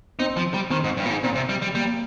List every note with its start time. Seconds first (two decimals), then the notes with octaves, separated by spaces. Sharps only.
0.19 C4 D#4
0.37 F3
0.54 G3
0.71 D#3 C4
0.84 G#2
0.97 G2
1.06 A#2
1.11 G#2
1.23 A#2 C4
1.35 C3
1.49 G3
1.62 G3
1.74 G3 A#3